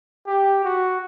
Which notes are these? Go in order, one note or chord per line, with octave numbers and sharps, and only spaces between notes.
G4
F#4